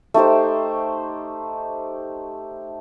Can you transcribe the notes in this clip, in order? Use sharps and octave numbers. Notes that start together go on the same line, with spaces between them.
A3 D#4 G4 C5